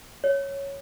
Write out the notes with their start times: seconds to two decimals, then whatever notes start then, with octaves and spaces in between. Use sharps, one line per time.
0.24 C#5